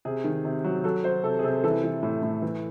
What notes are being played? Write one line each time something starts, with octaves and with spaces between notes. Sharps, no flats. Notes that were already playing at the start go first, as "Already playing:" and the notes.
C3 G#4
D#3
C3
F#3
F#3 A4
F#3 C5
C3 A4
G#4
C3 A4
E3 A4
E3
A2
A2
E3